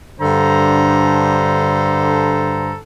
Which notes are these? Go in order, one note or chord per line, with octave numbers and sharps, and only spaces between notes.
G2 D3 A4 C5 A#5